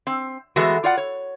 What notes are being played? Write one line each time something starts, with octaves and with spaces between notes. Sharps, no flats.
C4
E3 G#3 A3 B3 F#4
F4 D5 F#5
C#5